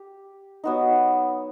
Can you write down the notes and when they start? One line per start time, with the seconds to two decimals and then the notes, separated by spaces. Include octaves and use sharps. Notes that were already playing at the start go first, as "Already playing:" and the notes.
Already playing: G4
0.64 F#3 B3 D#4